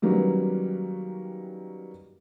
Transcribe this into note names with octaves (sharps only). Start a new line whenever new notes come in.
D#3 F#3 G3 A#3 B3 C#4